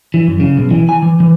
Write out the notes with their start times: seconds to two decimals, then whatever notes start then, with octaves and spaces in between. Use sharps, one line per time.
0.14 E3
0.27 F#2
0.40 C#3
0.57 B1
0.71 E3
0.89 G#5
1.02 E3
1.20 E3